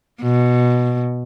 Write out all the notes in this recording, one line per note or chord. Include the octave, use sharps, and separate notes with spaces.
B2